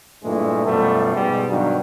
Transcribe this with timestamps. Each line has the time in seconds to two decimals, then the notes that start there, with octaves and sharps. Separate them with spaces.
0.24 G2 A#2 E3 G#3 A3
0.66 F#2 B2 F3 G3 A3
1.15 G#2 B2 G3 G#3
1.48 G2 B2 D3 D#3 F#3